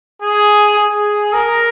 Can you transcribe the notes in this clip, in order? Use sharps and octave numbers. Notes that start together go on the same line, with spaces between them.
G#4
G#4
A#4